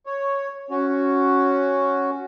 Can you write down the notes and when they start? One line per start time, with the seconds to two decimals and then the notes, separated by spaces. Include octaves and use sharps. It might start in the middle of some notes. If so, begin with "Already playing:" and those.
0.06 C#5
0.71 C#4 F#4